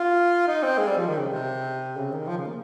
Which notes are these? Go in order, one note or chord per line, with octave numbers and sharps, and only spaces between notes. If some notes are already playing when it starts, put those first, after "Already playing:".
Already playing: F4
D#4
C4
G#3
G3
F3
D#3
C#3
C3
C#3
D#3
F3
C#3
A#3